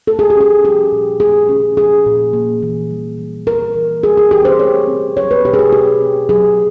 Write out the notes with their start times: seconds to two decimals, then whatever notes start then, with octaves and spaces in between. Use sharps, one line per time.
0.07 A3 A4
0.19 G#4
0.30 G4
0.36 C#4 G#4
0.64 F3 G4
0.92 A#2
1.20 A3 G#4
1.49 C#4
1.77 F3 G#4
2.06 A#2
2.33 A#3
2.62 E3
2.90 G3
3.18 E3
3.47 A#3 A#4
3.76 E3
4.03 G3 G#4
4.17 G#4
4.31 E3 G4
4.45 C5
4.59 A3 C#5
4.87 C4
5.17 F#3 C#5
5.31 B4
5.45 B2 G4
5.54 G#4
5.59 G4
5.72 A3 G4
6.01 C4
6.29 F#3 G#4